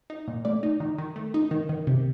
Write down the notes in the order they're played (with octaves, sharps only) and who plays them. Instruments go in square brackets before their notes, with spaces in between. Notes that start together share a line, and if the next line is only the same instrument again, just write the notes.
[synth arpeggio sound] D#4
A#2
A3 D5
D#4
D#3
D#3
A3
D#4
D#3
D#3
C3